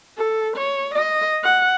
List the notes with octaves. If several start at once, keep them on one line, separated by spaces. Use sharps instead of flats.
A4
C#5
D#5
F#5